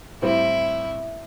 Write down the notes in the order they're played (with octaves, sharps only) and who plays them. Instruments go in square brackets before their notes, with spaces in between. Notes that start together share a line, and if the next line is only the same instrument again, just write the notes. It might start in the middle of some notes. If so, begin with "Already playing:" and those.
[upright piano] A2 G3 C4 [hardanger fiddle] E4